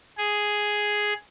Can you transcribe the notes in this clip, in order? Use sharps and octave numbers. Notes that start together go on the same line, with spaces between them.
G#4